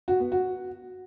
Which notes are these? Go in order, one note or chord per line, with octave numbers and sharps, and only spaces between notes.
F#4
B3
F#4